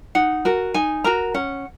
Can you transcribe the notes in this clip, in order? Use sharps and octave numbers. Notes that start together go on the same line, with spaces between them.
D#4 F#5
F#4 A#4
D#4 G#5
F#4 A#4 A#5
C#4 F#5